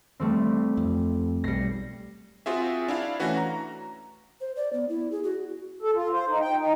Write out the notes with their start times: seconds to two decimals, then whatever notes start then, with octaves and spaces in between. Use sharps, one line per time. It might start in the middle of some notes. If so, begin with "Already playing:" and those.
0.20 G3 A3 C4
0.77 F2
1.44 B1 G3 A#6 C7 C#7
2.46 C4 F4 F#4 G#4 E5
2.88 D4 E4 F5
3.20 E3 A3 C#4 F#4 B4
3.37 A#5
4.41 C5
4.56 D5
4.73 B3
4.89 E4
5.12 G#4
5.24 F#4
5.82 A4
5.95 F4
6.12 C5
6.29 D#4
6.41 G5
6.57 D#4